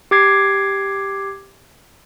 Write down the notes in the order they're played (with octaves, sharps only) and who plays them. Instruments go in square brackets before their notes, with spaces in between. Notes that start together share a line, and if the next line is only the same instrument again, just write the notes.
[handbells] G4 D6 G#6 C7